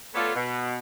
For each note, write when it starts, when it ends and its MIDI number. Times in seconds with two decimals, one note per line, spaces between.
0.15 0.34 57
0.15 0.34 59
0.15 0.34 65
0.15 0.34 69
0.15 0.34 73
0.15 0.34 74
0.35 0.78 47